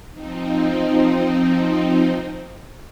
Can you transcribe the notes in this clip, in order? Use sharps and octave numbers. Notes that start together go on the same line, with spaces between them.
F3 C4 D#4